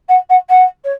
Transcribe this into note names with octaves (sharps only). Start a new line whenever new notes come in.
F#5
F#5
F#5
C#5